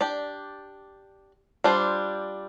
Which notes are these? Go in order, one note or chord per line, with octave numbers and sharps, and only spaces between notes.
D4 G4 D5
G3 D4 F4 C5